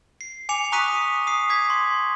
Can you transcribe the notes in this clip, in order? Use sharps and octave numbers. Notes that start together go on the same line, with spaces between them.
C7
G#5 D6 C#7 F7
A#5 C#6 D#6 F#6 B6 D#7
D#6 C7
D6 G#6 B6
C6